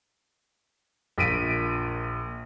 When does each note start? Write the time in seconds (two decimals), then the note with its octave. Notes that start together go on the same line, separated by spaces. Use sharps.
1.18 A#1 A#2 B6 D7 D#7